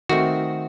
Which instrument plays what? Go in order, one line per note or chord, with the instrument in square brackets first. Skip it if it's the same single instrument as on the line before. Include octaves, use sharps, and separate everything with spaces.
[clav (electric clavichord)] D#3 A3 C4 F#4